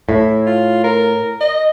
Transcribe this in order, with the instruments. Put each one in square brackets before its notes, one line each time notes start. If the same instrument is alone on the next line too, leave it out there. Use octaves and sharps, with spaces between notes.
[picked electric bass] A2 [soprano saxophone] E4
[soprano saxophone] F4
A#4
D#5